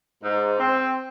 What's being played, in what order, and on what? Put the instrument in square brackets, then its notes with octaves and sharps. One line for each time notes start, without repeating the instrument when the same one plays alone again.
[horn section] G#2
C4